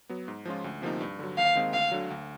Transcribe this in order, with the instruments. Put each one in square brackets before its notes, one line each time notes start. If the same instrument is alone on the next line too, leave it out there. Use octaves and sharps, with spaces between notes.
[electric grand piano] F#3 B3
G#2
F3 G#3 C#4 F4
D2
C3 F3 A#3 D#4
G2
D3 F#3
[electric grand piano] D#2 [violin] F5
[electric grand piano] D#3 G#3 C4 D#4
[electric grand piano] D2 [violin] F5
[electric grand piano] D3 F#3
D2